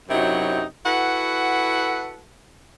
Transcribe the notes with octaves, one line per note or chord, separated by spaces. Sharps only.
F#2 C3 F#3 D#4 E4
E4 F#4 A4 B4 F#5